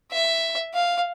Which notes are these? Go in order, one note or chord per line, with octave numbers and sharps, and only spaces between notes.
E5
F5